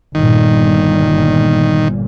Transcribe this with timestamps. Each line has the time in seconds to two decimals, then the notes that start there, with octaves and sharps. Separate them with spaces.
0.15 G1 A#2 D#3